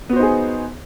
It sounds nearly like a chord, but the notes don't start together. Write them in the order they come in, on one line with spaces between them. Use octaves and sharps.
B3 F#4 C5 D#4 G#4